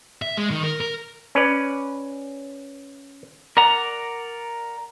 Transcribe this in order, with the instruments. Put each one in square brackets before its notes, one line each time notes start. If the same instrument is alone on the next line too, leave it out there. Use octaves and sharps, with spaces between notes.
[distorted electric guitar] E5
G#3
D#3
A#4
A#4
[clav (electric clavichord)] C#4 B4 D5
[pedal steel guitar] A#4 D5 F#5 A#5